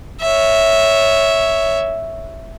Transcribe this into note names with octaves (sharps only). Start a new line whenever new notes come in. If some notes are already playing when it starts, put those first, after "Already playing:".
C#5 E5